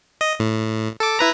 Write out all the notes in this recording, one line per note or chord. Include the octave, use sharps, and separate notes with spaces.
D#5
A2
A4 D6
E4 B4 A#5